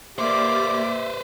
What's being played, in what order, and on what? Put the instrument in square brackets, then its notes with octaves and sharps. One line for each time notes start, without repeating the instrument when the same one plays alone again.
[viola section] A#3 G4 D5 [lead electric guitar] B4 C5 [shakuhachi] E5 [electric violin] D6